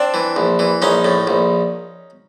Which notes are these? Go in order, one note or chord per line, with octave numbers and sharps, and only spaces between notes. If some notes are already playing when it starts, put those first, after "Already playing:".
Already playing: C4 D4
E3
A#1
E3
A#1 C#4 D#4
A2
A#1